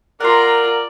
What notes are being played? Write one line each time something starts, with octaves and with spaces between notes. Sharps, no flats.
F4 A#4 D5 F#5 A#5 C6